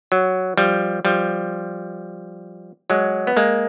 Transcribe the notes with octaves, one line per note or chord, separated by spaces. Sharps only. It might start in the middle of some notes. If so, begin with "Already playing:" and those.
F#3
F3 G3
F3 G3
F#3 G#3
B3
G#3 A#3